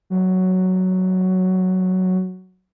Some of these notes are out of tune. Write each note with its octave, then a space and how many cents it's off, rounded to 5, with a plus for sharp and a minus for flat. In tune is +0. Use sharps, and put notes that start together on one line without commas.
F#3 +5